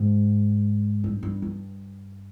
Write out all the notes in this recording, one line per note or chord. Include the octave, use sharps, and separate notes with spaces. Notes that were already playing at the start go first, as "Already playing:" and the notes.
Already playing: G#2
G2
G2
G2